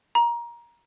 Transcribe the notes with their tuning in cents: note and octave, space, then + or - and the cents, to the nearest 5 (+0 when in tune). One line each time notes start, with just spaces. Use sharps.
A#5 +20